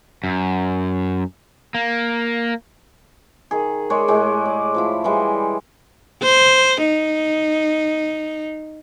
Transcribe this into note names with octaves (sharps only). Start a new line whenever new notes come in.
F#2
A#3
D#3 G#4
G#3 A#4 C#5 D5
A2 G#3 G4
D5
F3 A3 E4
E3 G3 G#3
C5
D#4